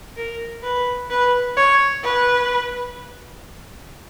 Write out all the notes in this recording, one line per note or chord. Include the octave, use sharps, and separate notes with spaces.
A#4
B4
B4
C#5
B4